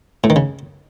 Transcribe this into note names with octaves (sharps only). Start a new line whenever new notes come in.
A2
D#3
C#3